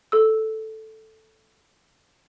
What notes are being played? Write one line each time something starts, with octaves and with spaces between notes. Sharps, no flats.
A4 E6